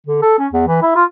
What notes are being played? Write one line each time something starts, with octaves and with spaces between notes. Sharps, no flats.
D3
A4
C#4
E2
E3
E4
F4